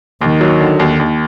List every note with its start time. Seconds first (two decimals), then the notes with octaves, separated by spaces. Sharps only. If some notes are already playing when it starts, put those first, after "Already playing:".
0.21 D#2 D#3
0.41 F#3
0.60 D3
0.79 D#2
1.00 D#2